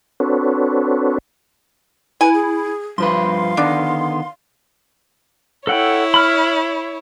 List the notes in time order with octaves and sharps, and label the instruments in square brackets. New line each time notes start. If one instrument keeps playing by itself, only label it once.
[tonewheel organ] C4 D4 F#4 A4 B4 C#5
[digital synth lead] E4 [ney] B4 [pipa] G#5
[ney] G#4
[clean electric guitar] G2 F3 B4 [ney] F5 [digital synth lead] C6
[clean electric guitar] D3 D#3 B3 [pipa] D4
[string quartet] E4 C#5 [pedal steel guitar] A4 F#5 G5
[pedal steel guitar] B5 F6